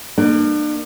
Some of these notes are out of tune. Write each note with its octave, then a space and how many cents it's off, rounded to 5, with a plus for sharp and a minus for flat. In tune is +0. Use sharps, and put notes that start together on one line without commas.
A#3 +0 D4 +40